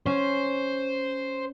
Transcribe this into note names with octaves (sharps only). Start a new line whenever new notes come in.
C#4 C5